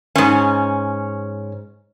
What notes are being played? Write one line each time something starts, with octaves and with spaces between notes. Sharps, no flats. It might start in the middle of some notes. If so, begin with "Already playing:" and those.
G#2 C#4